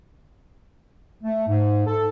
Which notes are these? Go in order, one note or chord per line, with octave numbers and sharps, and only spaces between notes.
A3
G#2
A4